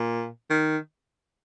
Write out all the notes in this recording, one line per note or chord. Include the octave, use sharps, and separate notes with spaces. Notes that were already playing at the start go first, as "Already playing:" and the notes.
Already playing: A#2
D#3